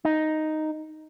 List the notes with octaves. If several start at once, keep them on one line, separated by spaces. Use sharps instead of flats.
D#4